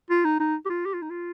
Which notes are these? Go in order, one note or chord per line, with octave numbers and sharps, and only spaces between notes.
F4
D#4
D#4
G4
F4
G4
F4
D#4
F4